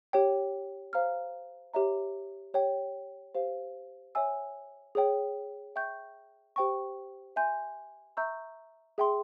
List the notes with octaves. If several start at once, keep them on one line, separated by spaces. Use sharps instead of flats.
G4 C#5 G5
C5 F5 A#5 F6
G4 C#5 E5 A#5
G4 C#5 G5
G4 C5 F5
C#5 E5 G#5 E6
G#4 C#5 G5
E5 G5 C#6 G6
G4 C5 G5 C#6
E5 G#5 C6 G6
E5 A#5 C#6 E6 G6
G#4 E5 G5 C6